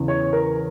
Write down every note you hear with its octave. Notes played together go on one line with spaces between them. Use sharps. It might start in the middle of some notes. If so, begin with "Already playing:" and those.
Already playing: E2 C#3 E3
C#5
A#4